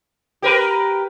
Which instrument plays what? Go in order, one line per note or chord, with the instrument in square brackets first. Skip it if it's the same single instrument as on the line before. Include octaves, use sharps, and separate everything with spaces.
[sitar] G4 A#4 B4